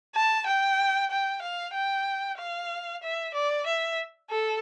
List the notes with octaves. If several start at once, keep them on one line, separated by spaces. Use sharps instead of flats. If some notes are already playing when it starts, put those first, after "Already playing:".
A5
G5
G5
F5
G5
F5
E5
D5
E5
A4